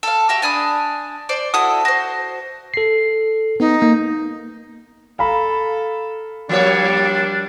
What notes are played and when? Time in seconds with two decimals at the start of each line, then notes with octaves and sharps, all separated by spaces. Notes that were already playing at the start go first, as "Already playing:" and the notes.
0.03 A4 F5
0.29 F#4 G4 E5
0.42 D4 G#5 B5 D#6
1.29 C5 D5
1.54 E4 F#4 A4 D#6
1.85 F#4 C5
2.74 A4 C7
3.60 B3 D#4
3.82 A#3
5.19 A4 F5 A#5 B5
6.49 F3 G3 A#3 D4 C#5